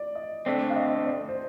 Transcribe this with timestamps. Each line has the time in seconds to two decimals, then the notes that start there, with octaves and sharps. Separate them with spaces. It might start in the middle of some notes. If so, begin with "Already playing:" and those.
Already playing: D5
0.15 D#5
0.46 D3 A3 C4 D5
0.70 F5
0.76 D#5
1.06 D5
1.29 C5